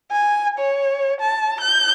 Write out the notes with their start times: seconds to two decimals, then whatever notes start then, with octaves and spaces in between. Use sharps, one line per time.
0.11 G#5
0.58 C#5
1.20 A5
1.61 G6